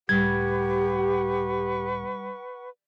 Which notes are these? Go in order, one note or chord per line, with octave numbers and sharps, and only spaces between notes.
C#2 A2 G3 G4 B4 F#5 C#6 G#6